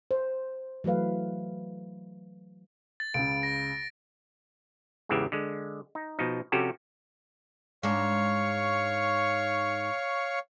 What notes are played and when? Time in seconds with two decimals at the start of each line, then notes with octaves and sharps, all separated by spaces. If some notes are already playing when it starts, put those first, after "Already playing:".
0.11 C5
0.84 E3 F#3 A3 B4 F5
3.00 A6
3.14 C#2 C#3 D7
3.43 A#6
5.09 E2 G#2 C#3 E3 G4 E5
5.32 D3 G#3
5.95 D#4
6.19 B2 F3 D#4
6.52 C3 F3 C#4 F#4 G4 A4
7.83 G#2 D4 C#5 F5 C#6